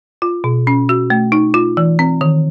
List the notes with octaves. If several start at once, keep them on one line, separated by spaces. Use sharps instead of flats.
F4
B2
C#4
F#4
A3
D#4
F4
E3
C4
D#3